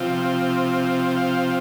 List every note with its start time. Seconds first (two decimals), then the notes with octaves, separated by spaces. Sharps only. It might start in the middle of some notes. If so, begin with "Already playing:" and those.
Already playing: C3 F3 C4 F4
1.17 F5